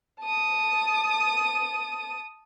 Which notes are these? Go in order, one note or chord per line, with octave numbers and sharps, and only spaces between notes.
A5 D#6